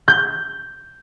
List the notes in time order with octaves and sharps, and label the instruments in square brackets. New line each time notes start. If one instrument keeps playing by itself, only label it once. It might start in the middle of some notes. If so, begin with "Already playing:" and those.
[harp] G6